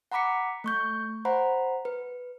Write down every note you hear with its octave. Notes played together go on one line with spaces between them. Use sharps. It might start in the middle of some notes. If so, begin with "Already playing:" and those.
F#5 A#5 B5 D6 B6 C#7
A3 C#6 G6
C5 F#5 A#5 B5
B4